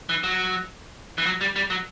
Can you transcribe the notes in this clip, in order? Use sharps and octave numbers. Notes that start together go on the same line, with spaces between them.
E3
F#3
E3
F#3
G3
G3
F#3